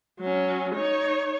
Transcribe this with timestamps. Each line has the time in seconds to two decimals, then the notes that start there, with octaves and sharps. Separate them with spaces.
0.20 F#3 C#4
0.75 D#4 C#5